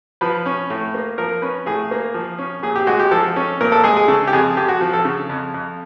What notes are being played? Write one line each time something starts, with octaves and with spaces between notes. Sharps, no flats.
F3 B4
C#4
A2
A#3
F3 A#4
C#4 B4
A2 G#4
A#3
F3
C#4
A#2 G#4
G4
G#3 F#4
G4
F3 A4
C#4
A#2 A#4
A4
G#3 G#4
G#4
C#3 A4
G4
F2 G#4
F2 G4
F#4
F3
A4
C#3
F2
F2